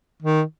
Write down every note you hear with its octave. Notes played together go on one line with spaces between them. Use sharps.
D#3